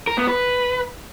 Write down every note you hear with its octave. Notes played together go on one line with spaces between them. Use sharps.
A#4
B3
B4